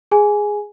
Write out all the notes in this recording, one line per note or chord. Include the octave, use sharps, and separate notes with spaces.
G#4 G#5